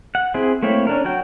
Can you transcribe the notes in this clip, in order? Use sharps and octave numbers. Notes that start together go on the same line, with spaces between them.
F#5
C4 E4 G#4
A3 A#3 C4 E4 C#5
C#4 D4 A#4
F#3 F#4 G5